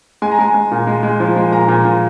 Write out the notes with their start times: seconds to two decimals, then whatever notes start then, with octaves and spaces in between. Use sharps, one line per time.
0.22 G#3 G#5
0.31 A#5
0.39 G#3 G#5
0.54 G#3
0.72 A#2
0.87 G#3
1.03 G#3
1.20 F3
1.36 G#3
1.52 A#2 A#5
1.68 A#2
1.85 A#2